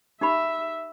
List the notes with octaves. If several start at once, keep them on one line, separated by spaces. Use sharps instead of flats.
D#4 G4 E5 B5